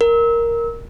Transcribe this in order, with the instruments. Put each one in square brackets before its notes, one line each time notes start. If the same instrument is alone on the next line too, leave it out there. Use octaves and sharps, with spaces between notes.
[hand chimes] A#4